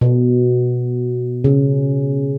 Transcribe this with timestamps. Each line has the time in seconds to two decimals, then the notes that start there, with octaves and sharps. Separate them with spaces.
0.01 B2
1.44 C#3